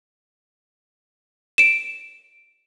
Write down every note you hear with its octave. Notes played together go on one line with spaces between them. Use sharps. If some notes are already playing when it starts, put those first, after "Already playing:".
D7 E7